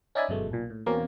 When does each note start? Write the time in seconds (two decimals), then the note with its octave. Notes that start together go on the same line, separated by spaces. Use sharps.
0.15 C#4 D#4 D5 E5 G#5 B5
0.29 G1 F#2 B2 G#3 A3
0.51 B1 A#2
0.70 A2
0.86 E2 B2 A#3 C4 C#4